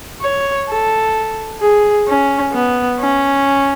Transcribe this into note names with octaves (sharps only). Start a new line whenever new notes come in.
C#5
A4
G#4
C#4
B3
C#4